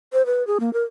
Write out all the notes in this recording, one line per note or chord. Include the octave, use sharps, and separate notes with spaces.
C5
B4
G#4
A#3
A#4